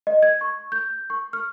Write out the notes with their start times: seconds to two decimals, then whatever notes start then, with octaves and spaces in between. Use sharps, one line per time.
0.07 D#5
0.23 G#6
0.41 C#6
0.72 G6
1.10 C#6
1.33 F6